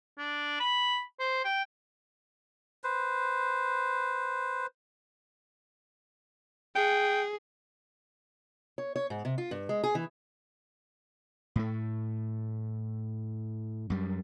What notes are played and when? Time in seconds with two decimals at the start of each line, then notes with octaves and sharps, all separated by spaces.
0.18 D4
0.60 B5
1.20 C5
1.44 G5
2.84 B4 C5
6.76 G#4 G5
8.78 C#5
8.96 C#5
9.10 G#2
9.25 C3
9.38 F4
9.51 G2
9.69 G#3
9.83 G#4
9.95 E3
11.56 A2 A3
13.90 F#2 G3